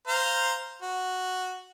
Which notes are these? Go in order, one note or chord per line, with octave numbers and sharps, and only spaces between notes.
C5 F5 A#5
F#4